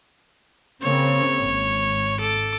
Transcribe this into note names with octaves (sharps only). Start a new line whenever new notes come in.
C#3 A#3 C4 C#5
G#1
A4 D6